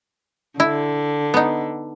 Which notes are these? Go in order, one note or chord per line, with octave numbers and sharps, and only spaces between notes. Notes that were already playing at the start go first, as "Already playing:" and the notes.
D3 E4
B3 D#4